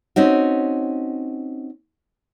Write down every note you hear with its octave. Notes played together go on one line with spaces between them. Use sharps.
C4 C#4 D#4 F#4